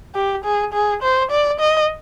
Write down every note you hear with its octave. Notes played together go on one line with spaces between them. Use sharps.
G4
G#4
G#4
C5
D5
D#5